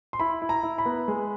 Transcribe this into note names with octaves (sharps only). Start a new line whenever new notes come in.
C6
E4 B5
E4
A#5
E4
B5
B3
G#3